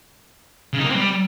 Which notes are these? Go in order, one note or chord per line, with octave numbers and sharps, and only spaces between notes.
C#3
D#4
A#3
C4
G3